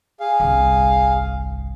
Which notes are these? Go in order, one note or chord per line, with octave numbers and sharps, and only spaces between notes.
G#4 F5
G1 C2